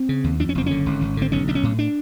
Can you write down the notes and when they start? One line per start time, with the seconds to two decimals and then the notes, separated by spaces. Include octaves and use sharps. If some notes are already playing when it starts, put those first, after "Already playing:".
Already playing: C4
0.09 C#3
0.24 D#2
0.40 F2 D4
0.49 C#4
0.55 F#1 C4
0.66 D3 C#4
0.86 G#1
1.01 G#1
1.17 D3 C4
1.32 B1 C#4
1.48 B1 D4
1.55 C#4
1.63 A2
1.79 D4